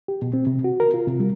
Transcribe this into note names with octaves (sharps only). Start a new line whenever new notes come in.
G4
B2
C4
C3
F#4
A#4
F4
C3
G3